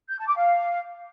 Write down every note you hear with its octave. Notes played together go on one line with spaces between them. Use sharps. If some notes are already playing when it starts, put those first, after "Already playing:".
G6
A5
D6
F5